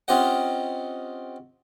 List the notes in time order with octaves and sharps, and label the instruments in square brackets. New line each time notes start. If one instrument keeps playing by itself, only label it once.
[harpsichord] C4 C#4 F4 G4 D#5 F#5